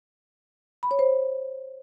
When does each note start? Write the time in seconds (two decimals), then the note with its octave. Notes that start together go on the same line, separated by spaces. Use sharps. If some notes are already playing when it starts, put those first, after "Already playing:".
0.83 B5
0.91 C#5
0.99 C5